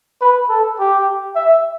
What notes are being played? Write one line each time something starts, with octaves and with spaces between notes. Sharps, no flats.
B4
A4
G4
E5